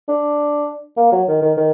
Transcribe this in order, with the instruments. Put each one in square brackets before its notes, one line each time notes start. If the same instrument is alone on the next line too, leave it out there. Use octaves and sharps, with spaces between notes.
[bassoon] D4
A#3
F#3
D#3
D#3
D#3